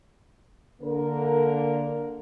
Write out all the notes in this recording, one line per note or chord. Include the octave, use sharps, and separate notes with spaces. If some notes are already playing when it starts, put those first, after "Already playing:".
D3 A#3 A#4